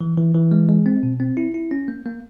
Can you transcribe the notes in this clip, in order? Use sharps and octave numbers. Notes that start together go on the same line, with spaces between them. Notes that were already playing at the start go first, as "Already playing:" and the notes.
E3
E3
E3
G#3
G#3
C4
B2
C4
E4
E4
C#4
A#3
A#3